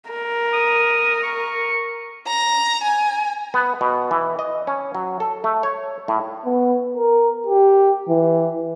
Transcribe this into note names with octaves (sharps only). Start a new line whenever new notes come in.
A#4
D#6
C#6
A#5
G#5
B3
B2
E3
D#5
C#4
F#3
A4
A3
C#5
A2
B3
A#4
G4
E3